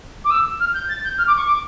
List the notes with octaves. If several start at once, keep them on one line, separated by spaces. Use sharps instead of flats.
D6
E6
F6
G6
A6
G6
F6
D6
C#6
D6